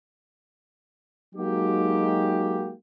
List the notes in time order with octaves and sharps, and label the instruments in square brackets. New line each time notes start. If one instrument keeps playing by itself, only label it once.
[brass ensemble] F#3 G#3 A#3 D#4 F#4 G4